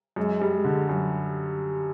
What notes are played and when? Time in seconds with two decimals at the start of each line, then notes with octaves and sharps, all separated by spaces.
0.16 F#2 G#3
0.41 G3
0.54 G#3
0.64 D3
0.89 F#2